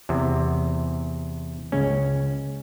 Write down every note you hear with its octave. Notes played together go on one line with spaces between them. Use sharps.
E2 C3
C#2 C#4